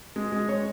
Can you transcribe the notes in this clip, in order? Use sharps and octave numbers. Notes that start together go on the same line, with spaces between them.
G#3
G#3
G#3 C#5